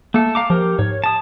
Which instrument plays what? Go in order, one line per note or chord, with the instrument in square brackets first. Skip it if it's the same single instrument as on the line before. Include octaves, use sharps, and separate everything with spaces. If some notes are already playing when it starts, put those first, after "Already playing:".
[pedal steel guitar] A3 A4 [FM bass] A#3
[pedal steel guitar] F5 A#5 D6
[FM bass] F3 [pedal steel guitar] G4 A#4
[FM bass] G#2 [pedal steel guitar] C#5
[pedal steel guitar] A5 D#6